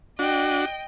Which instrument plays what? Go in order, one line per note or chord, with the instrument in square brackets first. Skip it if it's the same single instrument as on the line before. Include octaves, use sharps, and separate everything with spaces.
[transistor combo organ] D4 F#4 [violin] D#5 G5